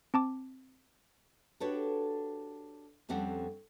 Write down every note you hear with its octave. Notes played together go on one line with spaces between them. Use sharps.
C4 A5 D6
D4 F#4 G4 A4 B4 C#5
F2 G3 C4 C#4 A4 F#5